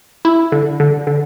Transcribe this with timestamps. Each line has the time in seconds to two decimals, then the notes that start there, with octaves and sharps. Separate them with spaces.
0.25 E4
0.52 D3
0.80 D3
1.07 D3